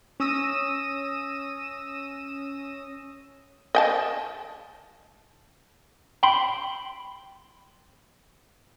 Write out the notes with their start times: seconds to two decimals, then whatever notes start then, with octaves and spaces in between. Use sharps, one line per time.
0.20 C#4 D#6 E6 A#6 D#7 E7
3.75 D#5 G5 A5
6.23 G5 B5 C6